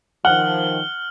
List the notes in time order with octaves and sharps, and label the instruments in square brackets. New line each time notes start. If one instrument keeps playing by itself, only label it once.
[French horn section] D#3 F3 [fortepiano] F#5 [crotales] F6 F#7 G7